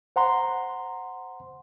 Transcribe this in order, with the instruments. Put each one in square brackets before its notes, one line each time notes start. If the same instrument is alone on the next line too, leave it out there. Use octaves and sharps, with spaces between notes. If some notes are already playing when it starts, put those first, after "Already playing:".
[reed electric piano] C5 F#5 A#5 C6